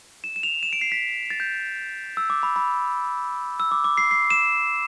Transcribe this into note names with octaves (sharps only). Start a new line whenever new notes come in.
E7
E7
F7
E7
D7
C7
B6
A6
G6
E6
D6
B5
B5
E6
D6
D6
C7
C7
E7